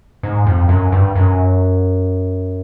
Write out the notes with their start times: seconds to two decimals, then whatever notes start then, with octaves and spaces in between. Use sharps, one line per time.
0.23 G#2
0.47 F2
0.69 F#2
0.92 G2
1.16 F#2